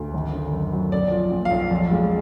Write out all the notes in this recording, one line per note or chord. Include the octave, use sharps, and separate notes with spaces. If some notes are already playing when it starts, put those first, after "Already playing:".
Already playing: D2
G#1
D3
F#2
F#3
B1 D5
F3
A#2
F5
B1
F2
G#3